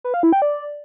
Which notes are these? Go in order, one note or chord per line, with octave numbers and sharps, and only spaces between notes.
B4
F5
E4
G5
D5